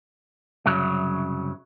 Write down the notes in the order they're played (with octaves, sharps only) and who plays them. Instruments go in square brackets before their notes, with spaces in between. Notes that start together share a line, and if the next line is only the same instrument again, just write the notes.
[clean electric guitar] C2 F#2 C#3 F#3